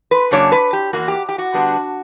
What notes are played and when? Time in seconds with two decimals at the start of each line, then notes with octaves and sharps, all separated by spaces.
0.11 B4
0.31 F#2 C#3 F#3 A#3 D4 C#5
0.52 B4
0.73 G4
0.93 E2 B2 A#3 F#4
1.08 G4
1.29 G4
1.38 F#4
1.54 D3 G3 B3 D4